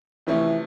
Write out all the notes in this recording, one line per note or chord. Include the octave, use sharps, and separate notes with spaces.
C3 E3 F3 A3 C#4